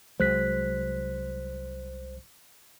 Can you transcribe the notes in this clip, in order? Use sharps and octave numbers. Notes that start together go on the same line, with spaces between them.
C2 F#3 G#3 C5 F#6 B6